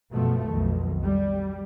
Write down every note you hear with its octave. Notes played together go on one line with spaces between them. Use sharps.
F#1 B2 F3 A3
B1 F2 D#3
G3